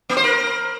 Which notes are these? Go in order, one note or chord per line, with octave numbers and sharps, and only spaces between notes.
A#3
C5
A#4